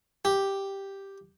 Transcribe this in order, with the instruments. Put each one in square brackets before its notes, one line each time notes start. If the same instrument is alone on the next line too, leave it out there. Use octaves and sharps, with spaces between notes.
[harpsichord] G4